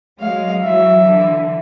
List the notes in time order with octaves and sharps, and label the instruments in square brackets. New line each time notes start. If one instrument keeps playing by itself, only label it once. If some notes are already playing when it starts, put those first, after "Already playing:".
[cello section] F#3 G#3 [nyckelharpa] F5
[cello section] E3 F#3 [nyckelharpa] E5
[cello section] D3 E3